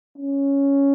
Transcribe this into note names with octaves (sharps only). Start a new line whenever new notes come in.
C#4